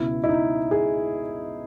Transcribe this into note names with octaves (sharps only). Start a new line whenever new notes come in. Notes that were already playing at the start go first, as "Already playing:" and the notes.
Already playing: C#2 B2 E4
E4
D#4
G#4